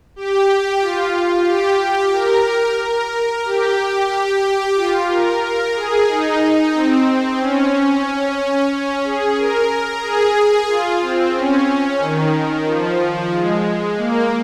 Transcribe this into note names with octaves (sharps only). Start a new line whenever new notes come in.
G4
F4
G4
A#4
A#4
G4
F4
A#4
A#4
G#4
D#4
C4
C#4
C#4
G#4
A#4
G#4
F4
C4
C#4
D#3
F3
G#3
A#3